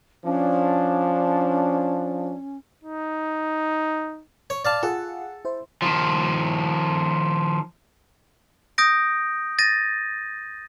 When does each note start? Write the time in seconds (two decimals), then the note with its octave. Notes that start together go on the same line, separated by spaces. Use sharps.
0.25 F3 C#4 D4
2.83 D#4
4.50 C#5
4.65 D5 F5 A5
4.83 F4 G#4 A4 F#5
5.45 E4 C5
5.82 D#3 F3
8.78 D#6 G6 A#6 D7
9.59 A6 A#6 D#7